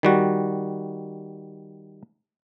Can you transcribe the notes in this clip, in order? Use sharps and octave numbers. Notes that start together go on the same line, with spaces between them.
D#3 G3 F#4